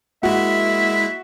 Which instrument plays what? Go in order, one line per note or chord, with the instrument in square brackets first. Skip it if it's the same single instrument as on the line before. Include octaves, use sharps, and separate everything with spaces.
[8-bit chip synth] G#3 E4 [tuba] A#3 [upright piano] F#4 [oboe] E5